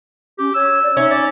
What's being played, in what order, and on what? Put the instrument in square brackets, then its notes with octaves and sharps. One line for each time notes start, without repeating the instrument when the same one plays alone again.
[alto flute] C#4 [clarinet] G4
[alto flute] C#5 [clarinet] E6
[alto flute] D5
[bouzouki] C#4 [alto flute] D#4 [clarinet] E5
[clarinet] D5